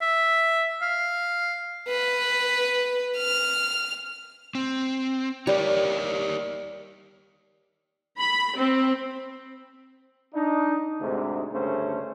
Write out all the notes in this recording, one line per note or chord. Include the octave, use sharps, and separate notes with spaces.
E5
F5
B4
F6
C4
G3 G4 A#4 C#5
B5
C4
D4 D#4
D2 G#2 C3
D2 G2 C#3 A3 C#4 C5